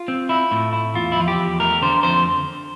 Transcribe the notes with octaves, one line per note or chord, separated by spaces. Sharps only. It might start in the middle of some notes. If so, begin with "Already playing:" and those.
Already playing: F4
C4
E4
A2
E4
E2 F4
E4
F3 F4
G4
E2
A3 A#4
D3 C5
F2 C5